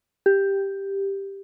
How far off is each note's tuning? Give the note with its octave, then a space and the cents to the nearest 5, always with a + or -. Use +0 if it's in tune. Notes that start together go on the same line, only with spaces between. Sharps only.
G4 +5